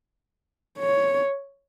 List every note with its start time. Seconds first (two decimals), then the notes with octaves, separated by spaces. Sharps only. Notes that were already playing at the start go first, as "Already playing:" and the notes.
0.79 C#5